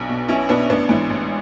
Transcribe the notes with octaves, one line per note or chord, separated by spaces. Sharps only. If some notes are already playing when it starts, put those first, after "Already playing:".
Already playing: B1 B3 D4
B2
B1 C#4 E4
B2 B3 D4
A1 B3 D4
G#2 E3
A1